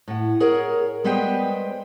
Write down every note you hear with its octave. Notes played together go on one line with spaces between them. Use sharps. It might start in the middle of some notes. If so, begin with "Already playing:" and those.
A2 F#5
G#4 A#4 C#5 F#5
G3 G#3 B3 B4 C5 G5